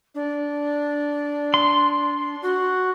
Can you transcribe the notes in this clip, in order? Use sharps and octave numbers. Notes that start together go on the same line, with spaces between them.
D4
C6
F#4